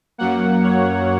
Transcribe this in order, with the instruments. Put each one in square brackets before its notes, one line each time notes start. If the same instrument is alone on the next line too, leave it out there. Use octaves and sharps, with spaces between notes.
[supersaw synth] F#2 F#3 A#3 F#5
C#5